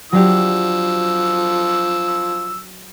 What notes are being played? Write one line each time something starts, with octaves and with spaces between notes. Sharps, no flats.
F3 F#3 D4 G4 E6